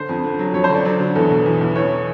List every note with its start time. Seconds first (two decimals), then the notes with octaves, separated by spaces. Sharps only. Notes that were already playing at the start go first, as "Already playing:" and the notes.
Already playing: D3 C5
0.09 F2
0.24 D3
0.39 F#3
0.54 F2 C#5
0.64 C5
0.69 D3
0.75 D5
0.85 F#3 D5
1.00 D3
1.15 E2 A4
1.30 B2
1.46 E2
1.61 E2
1.75 E2 C#5